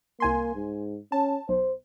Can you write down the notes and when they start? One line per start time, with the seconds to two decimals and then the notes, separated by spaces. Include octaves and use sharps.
0.20 C2 A#3 G#5 C6
0.55 G#2
1.12 C#4 A5
1.49 B1 C5